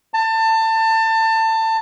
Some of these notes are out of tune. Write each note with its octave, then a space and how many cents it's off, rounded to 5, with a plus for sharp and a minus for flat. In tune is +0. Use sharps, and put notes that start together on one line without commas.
A5 +25